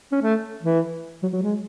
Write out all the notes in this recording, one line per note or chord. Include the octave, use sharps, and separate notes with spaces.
C#4
A3
E3
F#3
F#3
G#3